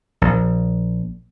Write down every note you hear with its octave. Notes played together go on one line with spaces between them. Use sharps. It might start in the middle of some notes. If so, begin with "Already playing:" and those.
A#1